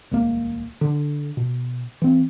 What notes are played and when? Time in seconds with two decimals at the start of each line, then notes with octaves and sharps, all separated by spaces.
0.11 D#1 C#2 G#3 A#3
0.81 D3
1.37 B2
2.02 E3 C4